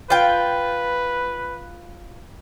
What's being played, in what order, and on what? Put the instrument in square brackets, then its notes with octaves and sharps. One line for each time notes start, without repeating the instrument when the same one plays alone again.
[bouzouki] F4 G5 [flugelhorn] B4